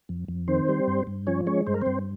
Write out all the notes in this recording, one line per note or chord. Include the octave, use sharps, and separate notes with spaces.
F2
F2
D#3 C4 C5
G3
G2
G2
F3 C#4 C#5
G#3 C#4 C#5
G2 C5
A#4
G2 C4 C5